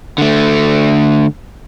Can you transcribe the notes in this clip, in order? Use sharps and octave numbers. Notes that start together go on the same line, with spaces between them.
D3 A3